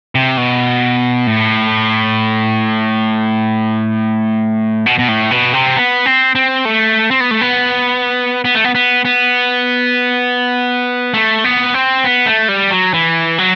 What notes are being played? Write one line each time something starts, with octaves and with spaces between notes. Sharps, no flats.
C3
B2
A2
B2
B2
A2
B2
C3
C4
B3
C4
C4
A3
C4
B3
A3
B3
B3
A3
B3
B3
B3
A3
B3
C4
B3
A3
G3
F#3
E3
F#3